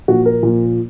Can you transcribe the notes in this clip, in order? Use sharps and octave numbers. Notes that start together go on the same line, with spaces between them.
A#2 F3 F#4
A#4
A#2 F3